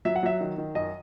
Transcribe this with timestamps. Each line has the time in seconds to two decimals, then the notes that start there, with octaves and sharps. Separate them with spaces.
0.05 F#3 E5
0.16 F#5
0.23 F#3 E5
0.41 D#3
0.58 D#3
0.75 F#2 D#5